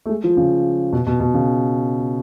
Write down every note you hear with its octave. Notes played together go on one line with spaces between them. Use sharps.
A3
G#3
F3
C#3
B2
B2
B2
C#3